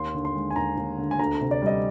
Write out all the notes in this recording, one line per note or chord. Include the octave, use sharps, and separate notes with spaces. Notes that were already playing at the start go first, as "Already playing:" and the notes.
Already playing: D#2 C6
D3
C6
G#3
G#5
D#2 A#5
D#2
D3
G#5
D2 A#5
A#5
C3
D5
G3 D#5